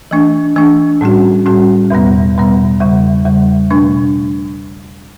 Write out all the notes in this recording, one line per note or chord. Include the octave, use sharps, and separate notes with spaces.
E3 A3 D4
E3 A3 D4
A2 G3 C#4 F#4
A2 G3 C#4 F#4
E2 B2 G3 B3
E2 B2 G3 B3
E2 C#3 G3
E2 C#3 G3
B2 A3 D4